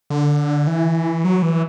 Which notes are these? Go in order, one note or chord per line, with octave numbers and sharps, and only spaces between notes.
D3
E3
F#3
E3